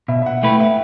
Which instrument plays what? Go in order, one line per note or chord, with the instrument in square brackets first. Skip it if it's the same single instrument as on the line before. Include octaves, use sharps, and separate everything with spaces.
[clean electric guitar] B2 [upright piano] E5
[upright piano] E5
F#5
[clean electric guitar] A3 E4 B4 [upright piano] G5
[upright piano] E5